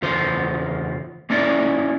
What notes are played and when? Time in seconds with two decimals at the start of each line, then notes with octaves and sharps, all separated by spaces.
0.02 E2 C#3 F4 C5
1.30 A#3 C#4 D#4 E4 D5